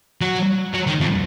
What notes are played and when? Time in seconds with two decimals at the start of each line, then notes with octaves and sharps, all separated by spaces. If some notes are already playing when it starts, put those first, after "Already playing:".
0.21 F#3
0.74 F#3
0.87 D#3
1.00 F2